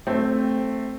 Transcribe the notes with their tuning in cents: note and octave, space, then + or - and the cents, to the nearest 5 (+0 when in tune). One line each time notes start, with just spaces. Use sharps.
A3 +0 C4 +0